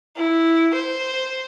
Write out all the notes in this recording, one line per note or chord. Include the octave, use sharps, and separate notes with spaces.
E4
C5